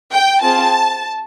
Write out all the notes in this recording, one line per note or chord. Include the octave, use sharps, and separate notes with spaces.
G5
C4 F4 G#4 A5